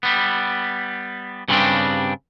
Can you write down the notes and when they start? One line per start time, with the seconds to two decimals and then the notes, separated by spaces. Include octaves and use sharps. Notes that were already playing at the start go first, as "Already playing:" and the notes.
0.03 G3 B3
1.48 G2 C#3 G3 A#3 C4 D4